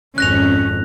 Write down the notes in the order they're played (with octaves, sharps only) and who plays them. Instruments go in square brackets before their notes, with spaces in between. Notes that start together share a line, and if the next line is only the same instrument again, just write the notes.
[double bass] G#1 F2 [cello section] C#4 [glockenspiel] F#6 A#6 F7